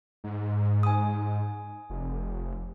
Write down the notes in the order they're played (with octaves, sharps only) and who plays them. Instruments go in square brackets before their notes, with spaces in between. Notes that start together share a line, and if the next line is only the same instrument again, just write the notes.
[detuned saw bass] G#2
[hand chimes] G#5 D#6
[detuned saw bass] F1